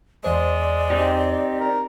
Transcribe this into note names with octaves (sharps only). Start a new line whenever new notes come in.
E2 G#3 C5 D5
C4 D#4 G4
A#4